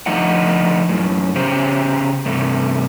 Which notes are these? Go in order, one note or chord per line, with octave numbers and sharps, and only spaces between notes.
D3 F3 A3 D#4 D#5 F#5
F#2 A2
C#3 C#4 G4 C5
G2 C3 A3